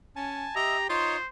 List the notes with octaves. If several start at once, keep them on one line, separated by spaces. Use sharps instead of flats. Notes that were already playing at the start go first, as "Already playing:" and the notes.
C#4 G#5 A5
G4 D#5 E5 A#5
D#4 F4 C5 C#5 D#6